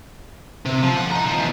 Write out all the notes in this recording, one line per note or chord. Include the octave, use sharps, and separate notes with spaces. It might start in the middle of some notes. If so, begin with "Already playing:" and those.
C3
F3
A2 F#5
D#5 A#5
F3
B2 E3